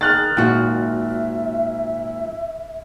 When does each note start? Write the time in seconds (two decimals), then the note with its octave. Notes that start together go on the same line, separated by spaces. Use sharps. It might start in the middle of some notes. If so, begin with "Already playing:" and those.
0.01 D#3 G#4 F6 F#6 A6
0.37 G#1 A#2 F3 F#4 E5 G5